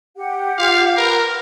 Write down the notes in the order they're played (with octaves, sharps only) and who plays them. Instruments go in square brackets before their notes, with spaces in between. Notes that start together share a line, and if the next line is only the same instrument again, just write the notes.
[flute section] G4 F#5
[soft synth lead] F4 [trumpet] F5
[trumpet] A#4 [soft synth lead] B4